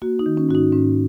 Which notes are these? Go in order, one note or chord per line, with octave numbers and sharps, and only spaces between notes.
A#3 F#4
D#4
D#3
C#4
G#2 F#4
D#4
G#2 C#4